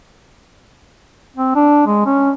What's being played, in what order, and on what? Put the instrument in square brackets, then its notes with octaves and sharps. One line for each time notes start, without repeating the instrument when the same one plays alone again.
[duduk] C4
D4
G#3
C#4